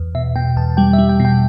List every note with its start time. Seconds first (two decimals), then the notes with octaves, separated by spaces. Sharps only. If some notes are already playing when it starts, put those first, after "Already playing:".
Already playing: E2
0.15 B2 E5
0.36 B2 G5
0.56 E2 A5
0.77 G3 G5
0.93 E5
0.98 G3
1.09 G5
1.20 B2
1.25 G5